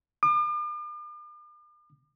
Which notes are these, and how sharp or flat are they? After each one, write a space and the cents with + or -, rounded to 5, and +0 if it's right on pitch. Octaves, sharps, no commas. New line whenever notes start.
D6 +45